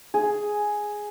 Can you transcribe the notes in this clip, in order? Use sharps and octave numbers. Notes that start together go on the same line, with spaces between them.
G#4